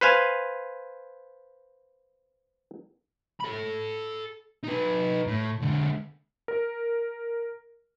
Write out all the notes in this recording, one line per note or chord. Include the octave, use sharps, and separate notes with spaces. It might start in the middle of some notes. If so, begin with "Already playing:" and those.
B4 C5 F5 G#5
A4 B5
D#4 B4
A2
D3 G#3
A#4